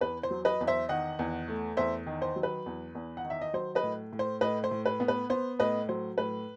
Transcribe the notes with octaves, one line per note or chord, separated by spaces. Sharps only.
E2 B4
C5
F#3
B4 D#5
E2
C5 E5
D#3 D#5 F#5
E2
A3
E2 C5 E5
D#3
C5
F#3
B4
E2
E2
F#5
D#3
E5
D#5
F#3 C5
B4 D#5
A2
A2
C5
A2 B4 D#5
C5
A2
B4
B3
B4
B3 C5
A2 B4 D#5
F#3 C5
A2 B4